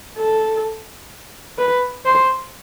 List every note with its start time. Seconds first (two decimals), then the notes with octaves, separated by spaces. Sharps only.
0.18 A4
1.58 B4
2.05 C5